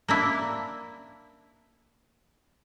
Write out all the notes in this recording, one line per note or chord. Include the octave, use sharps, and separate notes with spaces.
A#3 D4 E4